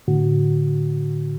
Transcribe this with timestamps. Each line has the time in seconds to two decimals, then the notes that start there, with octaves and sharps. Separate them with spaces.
0.08 A2 D3 F#4